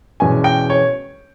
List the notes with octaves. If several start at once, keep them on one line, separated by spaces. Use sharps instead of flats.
E2 B2 G#3 C#4 G#5
G5
C#5